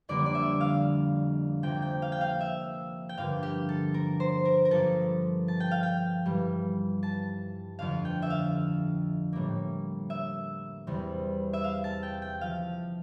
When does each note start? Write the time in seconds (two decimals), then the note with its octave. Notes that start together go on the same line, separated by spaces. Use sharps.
0.09 F2 D3 G3 A#3 D5
0.26 D5
0.35 E5
0.61 F5
1.63 C3 F3 A#3 G5
1.82 G5
2.02 F5
2.12 G5
2.21 F5
2.41 E5
3.09 G5
3.17 G2 D3 F3 A#3 F5
3.43 G4
3.69 A4
3.94 A#4
4.20 C5
4.45 A#4
4.65 A#4
4.71 G2 F3 A#3 A4
5.48 A5
5.60 G5
5.71 F5
5.83 G5
6.26 G2 E3 G3
7.03 A5
7.79 F2 D3 A3 F5
8.05 G5
8.22 E5
8.30 F5
9.33 A2 G3 A#3
10.10 E5
10.87 E2 C3 G3
11.53 E5
11.64 F5
11.84 A5
12.03 G5
12.22 G5
12.41 F3 F5